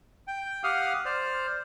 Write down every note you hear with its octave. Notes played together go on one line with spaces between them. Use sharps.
G5
G4 F5 F#5 D#6 F6
C5 D5 F6